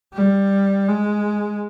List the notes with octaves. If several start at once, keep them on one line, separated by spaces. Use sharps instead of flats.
G3
G#3